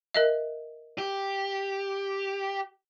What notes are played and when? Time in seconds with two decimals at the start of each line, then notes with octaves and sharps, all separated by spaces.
0.14 A#4 D#5 E5
0.98 G4